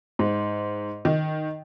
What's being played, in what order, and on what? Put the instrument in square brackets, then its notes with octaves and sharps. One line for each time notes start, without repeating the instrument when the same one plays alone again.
[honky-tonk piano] G#2
D#3